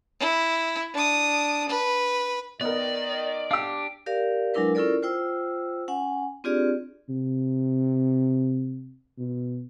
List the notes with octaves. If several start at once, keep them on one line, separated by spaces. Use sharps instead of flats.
E4
D4 D#6
B4
D#3 B3 A#4 D5 D#5
D4 G4 F5 E6
G4 A#4 D5 F5
F#3 G#3 D4 E4 A#4 B4
C#4 E4 F4 A4 A#4 D5
F4 C5 G5 E6
C#4 F#5 G#5
C4 D4 F4 G4 G#4 D5
C3
B2